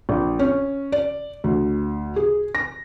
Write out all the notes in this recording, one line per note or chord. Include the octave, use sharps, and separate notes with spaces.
A#1
C#4
D5
D2
G#4
A#6